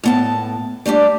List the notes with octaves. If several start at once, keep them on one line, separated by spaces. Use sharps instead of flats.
A2 B3 A5
G3 A3 D4 G4